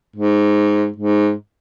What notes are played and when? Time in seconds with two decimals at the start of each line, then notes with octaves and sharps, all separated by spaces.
0.16 G#2
0.96 G#2